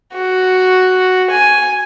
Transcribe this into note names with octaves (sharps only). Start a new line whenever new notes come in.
F#4
G#5